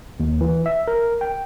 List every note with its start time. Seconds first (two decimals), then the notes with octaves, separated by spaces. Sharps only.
0.20 D#2
0.41 E3
0.66 E5
0.88 A#4
1.21 G5